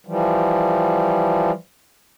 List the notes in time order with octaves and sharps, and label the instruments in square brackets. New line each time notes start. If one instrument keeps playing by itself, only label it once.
[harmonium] E3 F3 G3